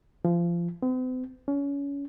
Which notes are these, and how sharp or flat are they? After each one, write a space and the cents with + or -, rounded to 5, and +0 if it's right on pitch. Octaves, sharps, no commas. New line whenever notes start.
F3 -25
C4 -45
C#4 +25